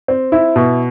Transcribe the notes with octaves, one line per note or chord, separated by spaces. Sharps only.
C4
E4
B2